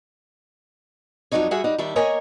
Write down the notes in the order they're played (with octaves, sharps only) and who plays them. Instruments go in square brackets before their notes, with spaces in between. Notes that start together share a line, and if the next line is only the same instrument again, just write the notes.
[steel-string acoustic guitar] F2 A#2 F#3 D4 D#4 C#5
G3 F#4 G#4 E5 F#5
G3 D#4 F#5
D#3 G3 D4 E5
A#3 A#4 C#5 D#5 G#5